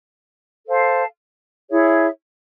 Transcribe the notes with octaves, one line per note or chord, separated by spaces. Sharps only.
A4 C5 F5 A5
E4 G#4 C#5 E5